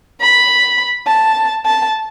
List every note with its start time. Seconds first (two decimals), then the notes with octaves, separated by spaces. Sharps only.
0.21 B5
1.07 A5
1.66 A5